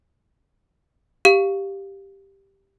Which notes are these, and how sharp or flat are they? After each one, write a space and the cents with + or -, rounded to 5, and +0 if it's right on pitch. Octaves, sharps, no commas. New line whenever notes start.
G4 +0 F5 +0